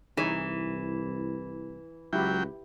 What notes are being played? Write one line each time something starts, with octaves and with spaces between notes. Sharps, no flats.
C2 E3 D#4 G#4 C#5
C#2 F#3 E4 G4 G5